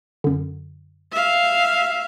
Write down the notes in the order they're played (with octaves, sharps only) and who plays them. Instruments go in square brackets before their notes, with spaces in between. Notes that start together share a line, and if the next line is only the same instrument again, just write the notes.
[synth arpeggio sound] F#2 D3
[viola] E5 F5